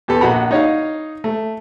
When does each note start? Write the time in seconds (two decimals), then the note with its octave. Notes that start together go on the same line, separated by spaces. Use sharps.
0.08 E2 G4 A4 B4
0.21 A#1 F#4 F#5 A#5 B5
0.51 D#4 C#5 D#5 F5
1.24 A3